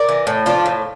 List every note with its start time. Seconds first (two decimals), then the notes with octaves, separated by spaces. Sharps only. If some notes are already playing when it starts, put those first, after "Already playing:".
Already playing: A#4 D5
0.09 E3
0.27 A2
0.46 F3 D4 F4
0.66 A2